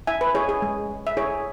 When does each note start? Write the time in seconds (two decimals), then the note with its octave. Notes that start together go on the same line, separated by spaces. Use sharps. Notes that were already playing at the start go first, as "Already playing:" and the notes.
0.07 E4 E5 G#5
0.21 B4
0.35 E4 G#4 C#5
0.49 G#4
0.62 G#3
0.90 G#3
1.07 E5
1.17 E4 G#4 C#5